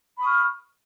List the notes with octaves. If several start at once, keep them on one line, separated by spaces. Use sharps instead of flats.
B5 C#6 D#6 F6